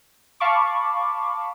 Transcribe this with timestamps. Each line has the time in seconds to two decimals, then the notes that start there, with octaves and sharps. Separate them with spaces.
0.40 F5 A5 B5 C#6 D6